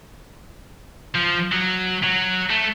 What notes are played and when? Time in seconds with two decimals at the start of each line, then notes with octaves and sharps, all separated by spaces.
1.15 F3
1.52 F#3
2.03 F#3
2.50 A3